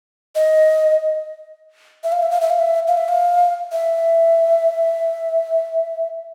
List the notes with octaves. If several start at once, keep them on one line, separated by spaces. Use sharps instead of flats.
D#5
E5
F5
E5
F5
E5
F5
E5
F5
E5
F5
E5